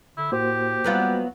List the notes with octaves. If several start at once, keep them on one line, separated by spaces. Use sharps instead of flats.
D3 E4
A2 A#3 F#4 G4 C5
F#3 G3 B3 F4